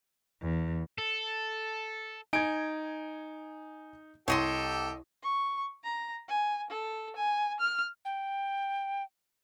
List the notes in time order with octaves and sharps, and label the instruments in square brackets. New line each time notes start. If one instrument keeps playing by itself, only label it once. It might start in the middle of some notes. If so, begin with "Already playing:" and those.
[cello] E2
[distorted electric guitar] A4
[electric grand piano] D#4 D7 [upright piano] G#5 G#6
[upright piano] C2 [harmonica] G4 A4 [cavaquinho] C#5 D#5 C6
[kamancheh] C#6
A#5
G#5
A4
G#5
F6
[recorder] G5